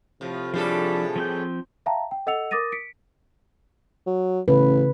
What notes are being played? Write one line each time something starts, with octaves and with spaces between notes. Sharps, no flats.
A2 C3 F3 F4
A2 F3 G3 D4 G#4 A4
F3 C4 G6
E5 F5 G5 A5 A#5
G5
A4 D#5 F#5 E6 C#7 F7
A#4 D6 D#6 A6 A#6 D#7
B6 C#7 D7
F#3
A1 C#3 B4